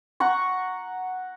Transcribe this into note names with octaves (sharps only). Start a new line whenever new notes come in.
F#5 A#5 C#6